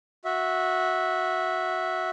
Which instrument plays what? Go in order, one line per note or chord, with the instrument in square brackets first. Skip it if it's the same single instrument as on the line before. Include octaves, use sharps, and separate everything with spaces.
[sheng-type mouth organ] F#4 E5